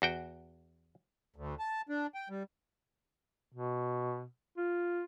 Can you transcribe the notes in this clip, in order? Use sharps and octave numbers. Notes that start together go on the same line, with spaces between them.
E2 F#4 G5
D2
A5
D4
G5
G3
B2
F4